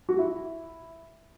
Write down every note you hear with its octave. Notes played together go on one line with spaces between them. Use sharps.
F#4
E4